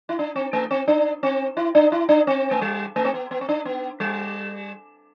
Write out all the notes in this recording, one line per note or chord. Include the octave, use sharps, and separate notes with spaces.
E4
D4
C4
A3
C4
D4
C4
E4
D4
E4
D4
C4
A3
G3
A3
C4
B3
B3
C4
D4
B3
G3